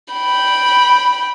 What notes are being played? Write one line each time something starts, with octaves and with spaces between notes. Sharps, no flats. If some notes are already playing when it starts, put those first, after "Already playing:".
G5 B5